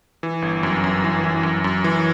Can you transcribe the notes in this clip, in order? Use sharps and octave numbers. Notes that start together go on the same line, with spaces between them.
E3
G1
F#2
F#2
E3
E3
F#2
F#2
E3